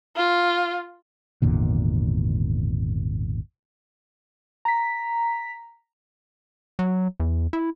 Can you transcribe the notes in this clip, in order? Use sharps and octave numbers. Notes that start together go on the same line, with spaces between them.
F4
G#1 E2 A#2 D3
A#5 B6
F#3
E2
E4